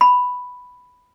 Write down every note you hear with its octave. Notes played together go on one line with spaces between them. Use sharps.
B5